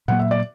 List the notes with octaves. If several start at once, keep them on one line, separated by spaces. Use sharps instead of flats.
A#2 F#3 A#3 F#5
E5
D5